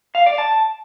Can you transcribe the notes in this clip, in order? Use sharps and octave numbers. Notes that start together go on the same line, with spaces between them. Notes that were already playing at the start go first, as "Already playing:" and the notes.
F5
D5
A5